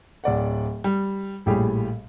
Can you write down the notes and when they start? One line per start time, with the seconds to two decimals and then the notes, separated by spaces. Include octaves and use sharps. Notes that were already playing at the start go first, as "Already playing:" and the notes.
0.24 D1 D5 F#5
0.84 G3
1.46 A#1 A2 G3 G4 G#4